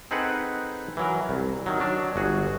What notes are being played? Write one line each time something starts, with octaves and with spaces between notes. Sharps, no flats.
C4 D#4 G#4 A4 B4 F#5
E3 F#3 A#4
C2
D#3 F#3
F#3 D4
G1 F#4 G#4